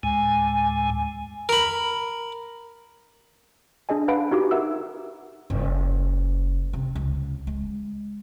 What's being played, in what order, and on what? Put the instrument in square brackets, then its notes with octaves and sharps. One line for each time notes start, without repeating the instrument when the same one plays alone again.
[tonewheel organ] D2 A2 G#3 [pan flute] G#5
[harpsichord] A#4 B5
[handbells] D4 G#4 D#5 G#5
D4 B4 F5 F#5 B5 D7
D#4 F#4 G4 D6
D#4 A#4 E5 F#5 E6
[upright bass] F#1
C3
C#2
G#3